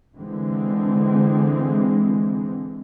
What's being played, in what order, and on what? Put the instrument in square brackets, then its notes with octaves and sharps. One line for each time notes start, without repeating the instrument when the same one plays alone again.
[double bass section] D3 E3 G#3 C4